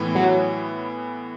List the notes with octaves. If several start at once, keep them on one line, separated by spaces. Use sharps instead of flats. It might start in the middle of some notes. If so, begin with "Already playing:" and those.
Already playing: A2 E3 B3 E4
F#3